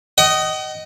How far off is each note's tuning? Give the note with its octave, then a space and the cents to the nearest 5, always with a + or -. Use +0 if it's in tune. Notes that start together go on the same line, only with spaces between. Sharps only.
D#5 +0 F#5 +45